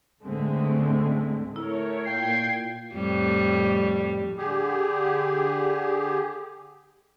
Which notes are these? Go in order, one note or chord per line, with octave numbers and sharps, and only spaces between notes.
C#2 A2 D3 G#3 A3 C4
A2 A3 E4 A#4 C#5
A#2 F4 G5 G#6 C7
F2 A2 G3
D3 G4 G#4